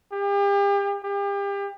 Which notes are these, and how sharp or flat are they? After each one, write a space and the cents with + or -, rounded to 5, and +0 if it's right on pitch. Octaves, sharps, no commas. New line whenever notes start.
G4 +40
G4 +35